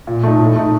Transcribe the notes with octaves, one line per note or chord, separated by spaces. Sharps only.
A#2
A3 D#4
A2
A3 D#4